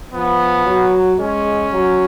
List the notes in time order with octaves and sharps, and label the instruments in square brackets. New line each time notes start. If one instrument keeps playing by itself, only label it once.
[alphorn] F3 [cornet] B3
[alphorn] F#3
[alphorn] G#3 [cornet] C#4
[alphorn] F#3